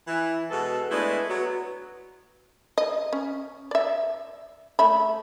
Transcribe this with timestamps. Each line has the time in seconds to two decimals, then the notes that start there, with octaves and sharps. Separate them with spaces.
0.08 E3 E4
0.50 B2 G#3 B3 A4
0.91 G#3 A3 B3 D4 E4
1.29 F#3 B3
2.78 D#5
3.13 C#4
3.71 D5 E5
4.79 A3 E5 B5